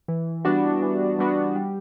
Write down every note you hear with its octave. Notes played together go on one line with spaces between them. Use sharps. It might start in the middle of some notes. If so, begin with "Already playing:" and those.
E3
G3 B3 D4 F#4
E3
G3 B3 D4 F#4
G3